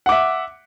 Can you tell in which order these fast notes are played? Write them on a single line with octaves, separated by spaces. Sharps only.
F#5 D6 E5